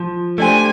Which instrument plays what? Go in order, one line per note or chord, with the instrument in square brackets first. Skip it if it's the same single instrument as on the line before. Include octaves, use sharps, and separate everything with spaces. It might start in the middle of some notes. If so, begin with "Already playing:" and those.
Already playing: [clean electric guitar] F3
[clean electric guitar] A3 D4 G4 C5 [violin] G#5